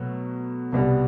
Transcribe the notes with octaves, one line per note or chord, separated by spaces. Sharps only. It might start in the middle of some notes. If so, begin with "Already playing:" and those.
Already playing: B2 F#3 A3
C2 B2 G3